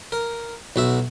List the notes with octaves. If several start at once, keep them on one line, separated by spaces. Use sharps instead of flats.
A#4
B1 F#4 E5